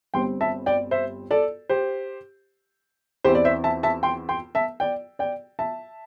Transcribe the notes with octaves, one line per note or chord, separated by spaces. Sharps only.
G1 G2 G3 C4 G5 C6
E5 A5
D5 G5
C5 E5
A4 D5
G4 C5
E2 E3 C4 E4 G4 C5
D5
C5 E5
E5 A5
E5 A5
G5 C6
G5 C6
E5 A5
D5 G5
D5 G5
E5 A5